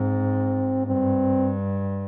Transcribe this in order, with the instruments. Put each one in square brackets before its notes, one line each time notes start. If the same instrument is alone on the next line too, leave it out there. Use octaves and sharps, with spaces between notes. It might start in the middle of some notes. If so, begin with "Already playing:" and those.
Already playing: [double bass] G#2 [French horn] C4
[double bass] G2 [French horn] C4